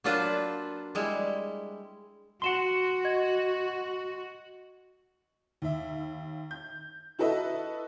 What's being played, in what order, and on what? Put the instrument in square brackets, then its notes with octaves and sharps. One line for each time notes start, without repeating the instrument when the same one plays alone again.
[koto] F#3 A#3 D4 F4 B4 C5
G3 G#3 E4
[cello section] F#4 [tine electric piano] F#5 C6 [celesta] C#7 E7 G7
[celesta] D#5 G#6
[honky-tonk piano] D#2 E5
G6
E4 F#4 A4 B4 D#5 E5